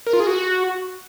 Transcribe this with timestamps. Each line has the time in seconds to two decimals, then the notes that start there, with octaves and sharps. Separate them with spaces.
0.07 A#4
0.13 F4
0.20 G#4
0.27 F#4